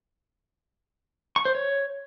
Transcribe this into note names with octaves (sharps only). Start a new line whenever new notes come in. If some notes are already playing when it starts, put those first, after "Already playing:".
C#6
C5
C#5